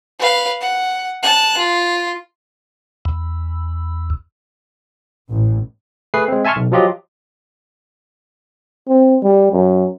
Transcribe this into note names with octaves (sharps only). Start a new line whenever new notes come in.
B4 F5
F#5
A5 F#6
F4
E2
A1
A3 G#4 B4 C7
G#3 C4
E5 G#5 A5 C6 C#6 F6
B1
F3 F#3 F4 G4 D#5
C4
G3
F#2